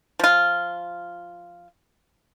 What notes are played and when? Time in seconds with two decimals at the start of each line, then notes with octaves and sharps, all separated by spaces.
0.19 F3 F4